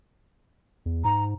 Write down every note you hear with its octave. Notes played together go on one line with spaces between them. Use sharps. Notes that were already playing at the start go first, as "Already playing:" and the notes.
E2
G#2 A#5